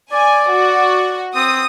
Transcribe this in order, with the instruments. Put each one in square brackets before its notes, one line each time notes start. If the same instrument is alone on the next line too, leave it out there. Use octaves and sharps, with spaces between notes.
[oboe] D5 [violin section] G#5
[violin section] F#4
[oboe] C4 [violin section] D#6